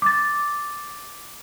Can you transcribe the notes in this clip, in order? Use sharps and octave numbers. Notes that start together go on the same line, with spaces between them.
D6 A6